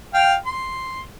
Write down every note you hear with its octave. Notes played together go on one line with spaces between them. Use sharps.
F5 G5
C6